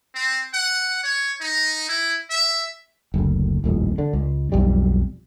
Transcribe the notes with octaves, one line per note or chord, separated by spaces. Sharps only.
C4
F#5
C#5
D#4
E4
E5
F#1 D2
D#1 A1 F2
D3
C#2
B1 F2 G3